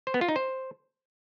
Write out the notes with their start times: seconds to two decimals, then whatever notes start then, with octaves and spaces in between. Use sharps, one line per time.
0.07 C5
0.14 B3
0.21 F4
0.29 D#4
0.36 C5